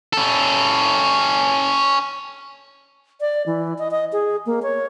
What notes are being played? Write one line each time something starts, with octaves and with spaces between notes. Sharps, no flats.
C#4 A4
D5
E3
D#5
D#5
G#4
A#3
C#5